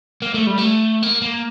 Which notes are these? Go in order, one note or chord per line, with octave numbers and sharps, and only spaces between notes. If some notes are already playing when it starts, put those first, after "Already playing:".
A#3
A3
G3
A3
A#3
A#3